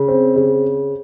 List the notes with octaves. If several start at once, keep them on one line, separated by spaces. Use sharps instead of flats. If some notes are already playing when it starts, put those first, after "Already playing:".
Already playing: C#3
C4
C#3